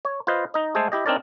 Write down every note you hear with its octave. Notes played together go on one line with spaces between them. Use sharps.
C#5
F4 B4 C5 D#5
D#4 D#5
G#3 A3 G#4 A4 C5
E4 G4 D#5
C4 D4 D#4 A#4 C#5 D5